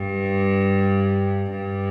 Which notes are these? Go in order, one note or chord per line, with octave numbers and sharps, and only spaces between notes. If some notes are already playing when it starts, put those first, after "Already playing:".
Already playing: G2
G2